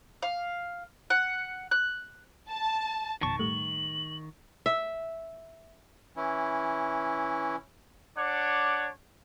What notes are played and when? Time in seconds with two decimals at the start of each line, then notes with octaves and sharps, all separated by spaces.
0.22 F5
1.10 F#5
1.71 F#6
2.51 A5
3.21 A1 F2 B2 D#3 A5 C#6
3.39 A2 G3 A3 F#7
4.66 E5
6.16 E3 C#4 E4
8.17 D4 C#5 F#5 D6